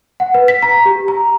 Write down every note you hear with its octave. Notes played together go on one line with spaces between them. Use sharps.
F#5
B4
B6
A#5
G4
A#5